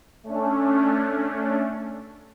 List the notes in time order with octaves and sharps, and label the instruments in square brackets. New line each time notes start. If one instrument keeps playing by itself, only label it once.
[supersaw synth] A3 C#4 D4